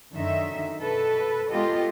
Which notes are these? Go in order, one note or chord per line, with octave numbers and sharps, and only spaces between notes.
F#2 D3 D#3 D#4 E5
B2 A4 B4
G#3 B3 F4 G4 A4 D#5